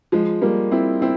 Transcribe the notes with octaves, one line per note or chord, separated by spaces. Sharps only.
F3 G#3
G3 A#3
C4 E4
C4 E4